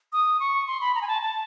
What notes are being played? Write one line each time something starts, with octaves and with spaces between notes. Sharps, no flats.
D#6
C#6
C6
B5
A#5
G#5
A5
A5